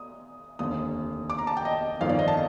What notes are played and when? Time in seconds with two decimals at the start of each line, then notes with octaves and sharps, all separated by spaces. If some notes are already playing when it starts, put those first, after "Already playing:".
Already playing: D#6
0.59 F1 D#2 D3 D#6
1.30 D6
1.38 A#5
1.47 A5
1.57 G5
1.65 D#5
2.01 G1 F2 D#3 F5
2.09 D5
2.19 D#5
2.28 A5